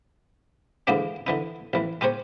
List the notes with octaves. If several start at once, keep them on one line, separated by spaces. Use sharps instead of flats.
D#2 G#2 D3 E3 A#3 D4
D3 E3 D#4
A1 E3
G#3 G4 A#4 C5 C#5